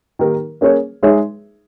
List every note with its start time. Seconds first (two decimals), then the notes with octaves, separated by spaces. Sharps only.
0.19 D#3 A#3 D#4 G4 A#4
0.61 A#3 C#4 G#4 C#5
1.03 G#3 D#4 G#4 C#5 E5